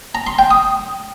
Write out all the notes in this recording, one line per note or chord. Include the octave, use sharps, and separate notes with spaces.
A#5
C6
G5
D#6